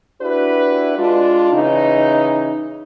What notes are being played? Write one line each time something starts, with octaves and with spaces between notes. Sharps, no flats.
D4 E4 F#4 G4 B4
G#3 D4 F4
C#3 E3 D#4